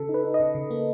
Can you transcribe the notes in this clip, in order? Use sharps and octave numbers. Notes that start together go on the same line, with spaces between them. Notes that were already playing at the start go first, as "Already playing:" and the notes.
Already playing: C#3 A4
D#4
B4
D#4
D#5
C#3
C#3
A#3